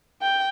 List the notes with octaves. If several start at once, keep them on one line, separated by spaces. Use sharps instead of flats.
G5